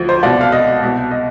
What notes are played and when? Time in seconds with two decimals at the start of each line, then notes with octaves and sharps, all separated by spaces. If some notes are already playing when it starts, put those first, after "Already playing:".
Already playing: D2 F3
0.09 C5
0.23 C2 B2 D5
0.41 F5
0.52 D#5
0.83 C2 B2
1.11 D#5